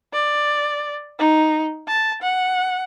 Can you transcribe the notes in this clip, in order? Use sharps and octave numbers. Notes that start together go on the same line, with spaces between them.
D5
D#4
A5
F#5